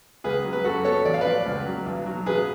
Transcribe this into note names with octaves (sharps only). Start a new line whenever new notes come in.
C#2 G#4 B4
F#3
B4
F#2 F#4 A4
B3 A4 C#5
A1 D5
F5
F3 B4 D5
C#2
F#3
B1
F#3
A1 G#4 B4